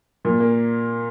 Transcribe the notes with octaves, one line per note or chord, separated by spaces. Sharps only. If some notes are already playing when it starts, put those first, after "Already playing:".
A#2
A#3